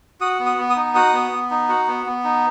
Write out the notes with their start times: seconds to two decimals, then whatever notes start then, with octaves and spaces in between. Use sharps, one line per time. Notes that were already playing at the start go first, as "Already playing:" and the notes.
0.21 F#4 D#6
0.40 B3
0.46 D#6
0.58 B3
0.70 D#6
0.76 D#4
0.95 F#4 D#6
1.13 B3
1.32 B3
1.51 D#4
1.69 F#4
1.87 B3
2.06 B3
2.24 D#4